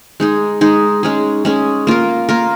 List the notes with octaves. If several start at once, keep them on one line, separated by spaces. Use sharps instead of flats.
G#3 D#4 G#4
G#3 D#4 G#4
G#3 C#4 G#4
G#3 C#4 G#4
A#3 F4 A#4
A#3 F4 A#4